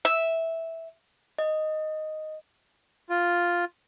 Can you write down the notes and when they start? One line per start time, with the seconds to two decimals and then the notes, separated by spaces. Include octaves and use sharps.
0.05 E5
1.38 D#5
3.10 F4